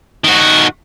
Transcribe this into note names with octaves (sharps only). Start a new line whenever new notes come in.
D#3 F#4